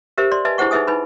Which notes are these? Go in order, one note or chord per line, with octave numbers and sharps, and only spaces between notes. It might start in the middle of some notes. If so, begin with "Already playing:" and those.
G4 A#4 C5 E5
D5 C6
B4 D#5 E5 G#5 A5
D4 E4 G#4 C5 F#5 C#6
D#4 G#4 B4 E5 G#5 D#6
D#4 B4 G#5 B5